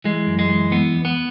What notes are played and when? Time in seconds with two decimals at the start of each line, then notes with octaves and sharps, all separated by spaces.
0.04 E3 G#3
0.27 F#2
0.39 G#3
0.49 E3
0.71 E3 B3
0.94 E2
1.05 B3